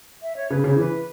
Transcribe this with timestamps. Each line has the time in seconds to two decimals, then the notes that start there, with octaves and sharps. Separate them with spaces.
0.22 E5
0.36 C#5
0.50 C#3 B4
0.64 C#3
0.67 C#5
0.76 E3 B4